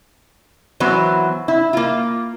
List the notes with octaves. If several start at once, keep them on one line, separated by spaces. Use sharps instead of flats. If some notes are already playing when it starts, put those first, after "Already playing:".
E3 F#3 B3 C5
E4
A#3 F4